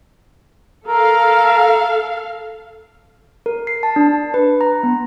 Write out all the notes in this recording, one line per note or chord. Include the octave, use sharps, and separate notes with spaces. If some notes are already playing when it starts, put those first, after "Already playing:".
A4 A#4 F5
A#4
C7
A5
D4
B4
A#5
B3